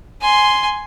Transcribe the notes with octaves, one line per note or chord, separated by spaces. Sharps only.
G#5 C6